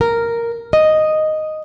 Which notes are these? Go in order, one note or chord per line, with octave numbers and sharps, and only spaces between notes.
A#4
D#5